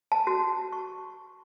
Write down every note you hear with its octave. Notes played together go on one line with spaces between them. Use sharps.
A5
F#4
C#6